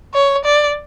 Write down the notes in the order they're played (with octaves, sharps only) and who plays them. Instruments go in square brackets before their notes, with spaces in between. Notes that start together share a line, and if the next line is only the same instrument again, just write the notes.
[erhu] C#5
D5